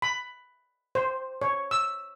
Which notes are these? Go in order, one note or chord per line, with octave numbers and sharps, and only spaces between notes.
B5
C5
C#5
E6